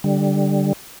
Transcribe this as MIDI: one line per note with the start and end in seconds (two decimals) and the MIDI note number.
0.04 0.73 50
0.04 0.73 55